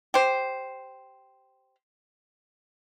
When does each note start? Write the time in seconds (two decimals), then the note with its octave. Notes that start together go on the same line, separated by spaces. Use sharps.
0.14 G4 C5